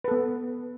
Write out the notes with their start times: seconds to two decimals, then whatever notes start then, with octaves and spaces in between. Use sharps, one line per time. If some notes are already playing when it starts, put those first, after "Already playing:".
0.04 B4
0.08 A4
0.11 B3